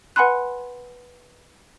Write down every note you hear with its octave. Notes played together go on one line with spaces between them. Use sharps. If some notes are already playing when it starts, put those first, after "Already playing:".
B4 F#5 G#5 B5 C6 F#6